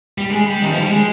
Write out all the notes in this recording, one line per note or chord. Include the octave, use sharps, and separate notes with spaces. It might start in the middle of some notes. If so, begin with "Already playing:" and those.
G3
G#3
G3
D#3
F3
G3
G#3